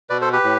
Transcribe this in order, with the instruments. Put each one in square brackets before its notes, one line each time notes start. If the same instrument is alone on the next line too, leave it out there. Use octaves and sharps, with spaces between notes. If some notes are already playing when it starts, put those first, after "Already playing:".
[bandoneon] B2 B4 D5
A4 C5
G4 B4
A2